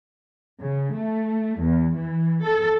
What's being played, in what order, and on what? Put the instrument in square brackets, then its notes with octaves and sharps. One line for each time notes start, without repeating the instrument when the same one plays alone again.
[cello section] C#3
A3
E2
E3
A4